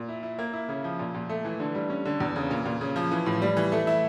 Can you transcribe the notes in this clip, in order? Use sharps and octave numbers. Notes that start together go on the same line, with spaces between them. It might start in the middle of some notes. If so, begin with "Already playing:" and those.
Already playing: A#2
E4
E4
A#3
E4
C#3
F3
A#2
A#2
A3
E3
D3
G3
C#4
D3
E2
C#3
A#2
A#2
C#3
F3
E3
A2
G3
E3
A3
E4